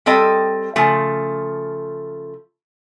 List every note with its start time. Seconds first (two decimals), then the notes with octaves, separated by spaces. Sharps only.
0.06 G3 C4 A4 D#5
0.76 C#3 F3 A3